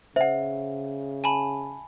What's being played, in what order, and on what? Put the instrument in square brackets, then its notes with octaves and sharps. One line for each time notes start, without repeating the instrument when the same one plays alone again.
[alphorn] C#3 [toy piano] C5 F#5 [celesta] E5
[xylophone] G#5 A5 B5